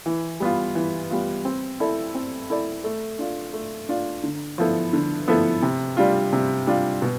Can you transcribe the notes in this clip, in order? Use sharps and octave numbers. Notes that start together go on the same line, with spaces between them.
E3
G3 B3 F4
E3
G3 B3 F4
C4
E4 A4 D5
C4
E4 A4 D5
A3
D4 F4
A3
D4 F4
D3
F3 B3 E4 A4
D3
F3 B3 E4 A4
C3
G3 D4 F4
C3
G3 D4 F4
B2